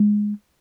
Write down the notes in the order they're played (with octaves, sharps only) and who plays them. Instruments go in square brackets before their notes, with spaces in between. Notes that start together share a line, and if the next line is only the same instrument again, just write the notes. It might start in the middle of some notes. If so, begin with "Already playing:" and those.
Already playing: [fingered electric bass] G#3